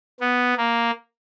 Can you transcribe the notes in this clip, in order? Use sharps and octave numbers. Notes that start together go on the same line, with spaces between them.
B3
A#3